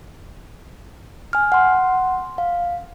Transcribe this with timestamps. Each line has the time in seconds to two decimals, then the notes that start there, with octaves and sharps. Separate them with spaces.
1.33 G#5 F6
1.52 F#5 C6
2.38 F5